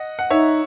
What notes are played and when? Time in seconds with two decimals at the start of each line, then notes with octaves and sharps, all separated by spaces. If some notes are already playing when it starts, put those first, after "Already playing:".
Already playing: D#5 F#5
0.19 F#5
0.30 D#4 C#5 E5